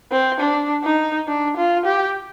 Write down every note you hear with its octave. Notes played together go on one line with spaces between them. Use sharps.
C4
D4
D#4
D4
F4
G4